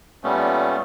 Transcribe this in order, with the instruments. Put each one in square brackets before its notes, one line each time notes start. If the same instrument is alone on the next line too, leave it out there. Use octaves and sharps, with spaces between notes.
[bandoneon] A#2 G3 A3 B3 C#4